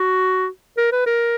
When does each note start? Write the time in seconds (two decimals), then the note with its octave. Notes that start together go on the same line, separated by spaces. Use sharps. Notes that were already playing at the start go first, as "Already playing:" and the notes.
Already playing: F#4
0.77 A#4
0.92 B4
1.06 A#4